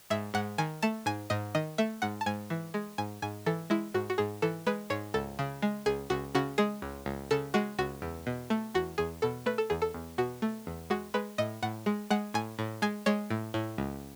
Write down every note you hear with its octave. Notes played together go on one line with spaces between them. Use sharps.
G#2 E5
G#2 F#5
D#3 G#5
A3 A5
G#2 G#5
G#2 D#5
D#3 D#5
A3 E5
G#2 F#5
A5
G#2 G#5
E3
G#3
G#2 G#5
G#2 G#5
E3 A4
G#3 E4
G#2 F#4
F#4
G#2 G#4
E3 A4
G#3 B4
G#2 C#5
C#2 A4
C#3
G#3
C#2 G#4
C#2 F#4
C#3 F#4
G#3 G#4
C#2
C#2
C#3 A4
G#3 F#4
C#2 F#4
E2
B2
A3
E2 F#4
E2 G#4
B2 A4
A3 B4
A4
E2 G#4
A4
E2
B2 F#4
A3
E2
G#3 F#4
G#3 B4
A2 D#5
A2 F#5
G#3
G#3 F#5
A2 G#5
A2
G#3 G#5
G#3 C#5
A2
A2
C#2